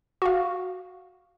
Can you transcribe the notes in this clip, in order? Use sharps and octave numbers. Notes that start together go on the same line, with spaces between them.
F#4 F5